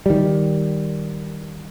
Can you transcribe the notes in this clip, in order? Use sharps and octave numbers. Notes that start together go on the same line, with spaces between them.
D#3 G3